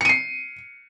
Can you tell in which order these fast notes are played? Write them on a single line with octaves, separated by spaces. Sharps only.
C#7 D#7 C7